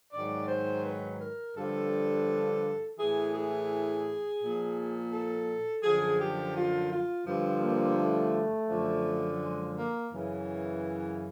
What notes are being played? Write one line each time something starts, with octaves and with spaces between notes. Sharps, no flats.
G#2 D#3 F#3 D5
C5
B4
A#4
G2 D3 F3 A4
A2 E3 G#4
G#4
A#2 F3
A4
F#2 D3 F3 G#4
G4
F4
F4
G2 D3 F3
A#3
A3
F#2 D3 F3
G#3
A#3
F#2 C#3 E3